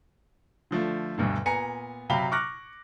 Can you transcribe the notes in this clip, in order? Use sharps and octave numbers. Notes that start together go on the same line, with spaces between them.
D3 F3 A3
D2 G2 B2 D3
A#2 B3 G#5 A#5 C#7
C3 F#3 F5 G5 B5 G7
C#6 D6 F6 F#6 A#6